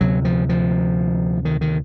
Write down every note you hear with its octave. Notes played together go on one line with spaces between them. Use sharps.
D2 C3 F#3
F3
F3
D#3
D#3